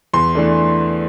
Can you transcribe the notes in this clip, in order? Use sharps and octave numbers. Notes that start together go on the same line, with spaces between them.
E2 C6
E3 A3 D4